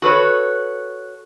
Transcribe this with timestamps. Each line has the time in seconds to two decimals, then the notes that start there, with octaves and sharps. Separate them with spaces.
0.02 F#4 A4 B4 C#5